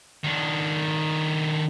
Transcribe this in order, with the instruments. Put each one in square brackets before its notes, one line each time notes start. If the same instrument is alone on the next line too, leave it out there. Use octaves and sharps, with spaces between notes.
[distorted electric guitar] D#3 D4